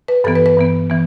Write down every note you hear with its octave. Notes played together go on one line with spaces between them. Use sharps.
B4
G2 E3 B3 A4
B4
B4
G2 E3 B3
E3 B3